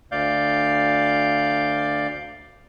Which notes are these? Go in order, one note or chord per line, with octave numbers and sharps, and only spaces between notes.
D2 D5 F5 G6